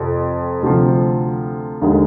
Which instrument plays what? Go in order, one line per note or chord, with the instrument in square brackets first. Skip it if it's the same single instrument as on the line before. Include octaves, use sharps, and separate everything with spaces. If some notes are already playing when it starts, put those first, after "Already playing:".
Already playing: [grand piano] F2 C3
D2 C3 F3
D#2 D3 G#3